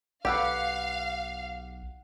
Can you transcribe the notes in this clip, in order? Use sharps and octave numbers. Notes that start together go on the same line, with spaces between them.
B1 G4 A4 B4 F5 F#5